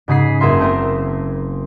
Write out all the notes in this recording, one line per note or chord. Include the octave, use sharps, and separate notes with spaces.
G#2 C#3 G#4 B6 C7
F#1 A#3 G#4 E5 C6
A3 C4 A#4